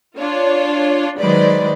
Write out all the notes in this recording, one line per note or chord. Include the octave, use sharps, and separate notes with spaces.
D4 F4 C#5
D#3 F#3 G#3 B4 C5 D5